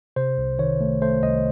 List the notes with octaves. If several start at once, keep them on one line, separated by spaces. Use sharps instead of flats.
C3 C5
C2
D#3 C#5
A3
A3 C5
C2 D#5